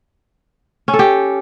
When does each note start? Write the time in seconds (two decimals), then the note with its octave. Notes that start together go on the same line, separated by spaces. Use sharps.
0.88 C#4
0.93 A4
0.99 G4